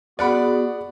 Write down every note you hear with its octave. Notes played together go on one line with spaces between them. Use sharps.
B3 F#4 G#4 D5 F#5 B5